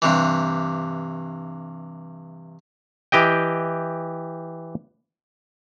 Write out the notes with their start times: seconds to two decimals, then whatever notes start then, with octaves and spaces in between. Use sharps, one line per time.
0.02 G2 C3 E3
3.12 E3 G4 D#5 G5